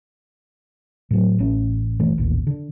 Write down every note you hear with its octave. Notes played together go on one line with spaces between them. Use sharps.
A2 F#3
A1 C#4
G1 A#2 E3 A3
A1 D#2 A#2
D3